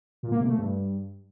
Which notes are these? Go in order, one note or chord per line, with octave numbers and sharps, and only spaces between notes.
A#2
A#3
C3
A3
G2